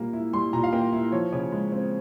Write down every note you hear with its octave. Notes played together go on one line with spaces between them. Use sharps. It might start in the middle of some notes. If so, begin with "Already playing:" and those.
Already playing: A#2 G3 A#3
E4
G3 C6
A#2 A#5
F5
A#3 G5
E4
F3 C#5
C#3
G#3
C4